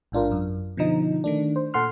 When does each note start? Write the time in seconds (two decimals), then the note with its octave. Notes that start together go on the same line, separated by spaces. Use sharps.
0.12 A1 G#2 D4 F4 A#4
0.32 F#2
0.77 B2 D3 F3 D#4
1.24 D#3 A3 D4
1.56 C5
1.74 A#2 A4 F#5 C6 F6